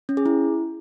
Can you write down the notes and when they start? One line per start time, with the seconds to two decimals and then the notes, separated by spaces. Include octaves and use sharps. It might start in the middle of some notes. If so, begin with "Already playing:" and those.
0.09 C#4
0.17 G#4
0.26 E4